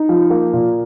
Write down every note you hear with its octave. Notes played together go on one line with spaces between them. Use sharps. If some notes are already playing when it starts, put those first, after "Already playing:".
Already playing: D#4
F3
A#3
A#2